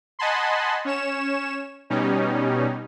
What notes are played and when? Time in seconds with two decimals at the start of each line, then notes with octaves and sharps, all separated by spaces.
0.19 D#5 F#5 G#5 A5 B5 C6
0.85 C#4 C#5 E7
1.90 B2 G3 C#4 D#4